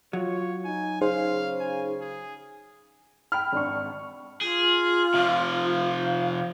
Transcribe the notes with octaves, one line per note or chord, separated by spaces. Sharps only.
F#3 F4 C#5
D#4 G#5
C#3 D#4 G#4 C5 F5
G#5
G#4
G5 B5 F6
G#1 D4 C#6
F4 G#4
C3 F3 F5